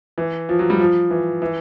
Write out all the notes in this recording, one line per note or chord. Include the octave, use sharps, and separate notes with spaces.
E3
F3
F#3
G3
F3
E3
E3